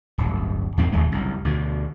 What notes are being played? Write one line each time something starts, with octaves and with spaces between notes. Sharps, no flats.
D1 G1
E2 G#2 C4
D#1 D#2 G#3 A3
F#1 C2
D2 B2 D3